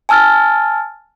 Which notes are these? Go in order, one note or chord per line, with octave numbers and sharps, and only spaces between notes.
G#5 A5 E6 F6 A6